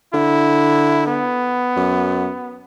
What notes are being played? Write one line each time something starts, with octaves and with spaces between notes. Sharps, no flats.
D3 E4
B3
F#2